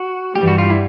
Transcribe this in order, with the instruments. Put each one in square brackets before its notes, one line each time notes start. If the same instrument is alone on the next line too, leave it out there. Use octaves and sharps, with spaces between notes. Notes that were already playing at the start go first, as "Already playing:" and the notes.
Already playing: [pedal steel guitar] F#4
[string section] G2 E3 G3 [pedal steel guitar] G4
[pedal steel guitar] F#4
F4
E4